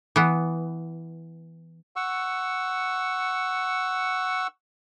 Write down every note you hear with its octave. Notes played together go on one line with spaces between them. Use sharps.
E3 B3
F#5 C#6 E6